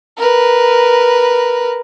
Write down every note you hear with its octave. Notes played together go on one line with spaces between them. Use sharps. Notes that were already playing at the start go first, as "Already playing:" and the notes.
A#4 B4